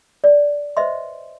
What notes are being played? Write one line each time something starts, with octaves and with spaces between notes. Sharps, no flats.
D5
B4 C5 D#5 E5 C6